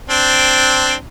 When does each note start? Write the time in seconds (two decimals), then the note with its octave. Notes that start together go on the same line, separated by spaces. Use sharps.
0.10 C4 D4